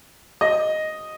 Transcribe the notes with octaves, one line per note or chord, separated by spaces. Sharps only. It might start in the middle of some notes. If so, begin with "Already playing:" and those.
D#5